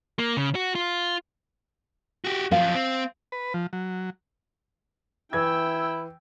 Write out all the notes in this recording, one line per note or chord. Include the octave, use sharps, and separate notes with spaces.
A#3
C#3
F#4
F4
F#4 G4
F#2 F3 F5
C4
B4
F3
F#3
E3 E4 G5 E6 G#6